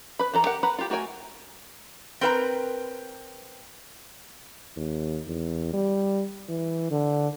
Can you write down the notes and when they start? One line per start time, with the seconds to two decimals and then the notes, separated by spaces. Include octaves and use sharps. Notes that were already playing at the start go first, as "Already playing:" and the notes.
0.19 B4 B5
0.33 E3 A4 A#5
0.45 G4 A#4 F#5
0.63 B4 F#5 A#5 B5
0.78 F4 G4
0.90 A3 F#4 A#4 G5 G#5
2.21 C4 A#4 B4 F#5 A#5
4.76 D#2
5.28 E2
5.73 G3
6.49 E3
6.91 D3